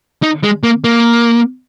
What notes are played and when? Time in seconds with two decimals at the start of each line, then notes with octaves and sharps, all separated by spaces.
0.23 D#4
0.44 G#3
0.63 A#3
0.84 A#3